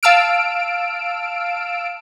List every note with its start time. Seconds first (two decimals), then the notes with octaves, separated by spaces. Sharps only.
0.03 F5 A5 E6 F6 D7